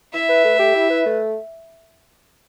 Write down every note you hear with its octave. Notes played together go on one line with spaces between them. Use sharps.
E4 E5
B4
A3
G4
E4
B4
A3